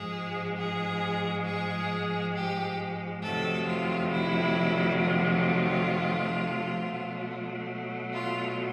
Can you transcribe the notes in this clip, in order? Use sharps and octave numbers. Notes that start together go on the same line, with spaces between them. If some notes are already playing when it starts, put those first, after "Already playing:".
Already playing: G#2 F3 G#3 G#4
G#4
G#4
G4
F2 C3 D#3 F#3 A3 A4
F4
E4
F4
B2 F#3 A3
F4